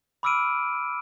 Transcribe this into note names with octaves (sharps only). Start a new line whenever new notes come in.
B5 D6 E6 F6 D7 D#7